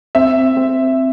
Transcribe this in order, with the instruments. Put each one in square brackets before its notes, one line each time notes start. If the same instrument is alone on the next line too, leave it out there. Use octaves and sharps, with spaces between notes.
[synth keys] C4 [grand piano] E5
[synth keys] C4